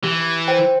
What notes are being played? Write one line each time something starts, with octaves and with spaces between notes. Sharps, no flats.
E3 G4
C5 G5